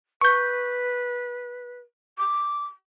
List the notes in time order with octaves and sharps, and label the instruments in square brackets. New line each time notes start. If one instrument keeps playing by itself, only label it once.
[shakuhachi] B4 [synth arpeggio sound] C#6 G6
[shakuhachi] D6